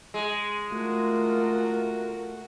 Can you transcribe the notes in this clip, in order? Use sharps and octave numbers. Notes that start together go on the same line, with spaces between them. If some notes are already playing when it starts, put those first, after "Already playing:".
G#3
A3 F4 F#4 A#4